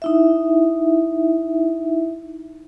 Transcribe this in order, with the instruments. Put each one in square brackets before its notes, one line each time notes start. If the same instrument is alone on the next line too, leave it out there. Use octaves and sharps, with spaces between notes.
[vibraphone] D#4 E4 E5